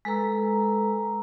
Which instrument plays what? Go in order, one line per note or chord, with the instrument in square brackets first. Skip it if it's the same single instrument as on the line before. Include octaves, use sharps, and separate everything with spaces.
[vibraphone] G#3 A4 B4 A#5 E6